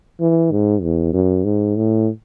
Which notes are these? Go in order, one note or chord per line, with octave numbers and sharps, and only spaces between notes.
E3
G#2
E2
F#2
G#2
A2